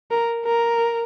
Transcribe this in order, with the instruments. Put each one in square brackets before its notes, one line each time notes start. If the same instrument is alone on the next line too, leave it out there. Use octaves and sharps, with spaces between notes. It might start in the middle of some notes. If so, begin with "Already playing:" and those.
[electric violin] A#4
A#4